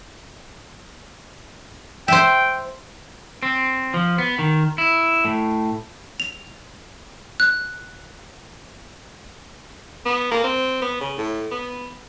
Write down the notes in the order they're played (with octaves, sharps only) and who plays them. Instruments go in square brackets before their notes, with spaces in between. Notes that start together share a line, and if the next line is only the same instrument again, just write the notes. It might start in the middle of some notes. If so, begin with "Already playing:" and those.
[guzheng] C5 E5 [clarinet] G5
[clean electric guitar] C4
F3
B3
D#3
E4
A2
[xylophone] F7
F#6
[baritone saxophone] B3
A#3
C4
B3
C#3
A2
B3